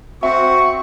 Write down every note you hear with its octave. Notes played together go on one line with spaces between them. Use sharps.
C4 F#4 E5 C#6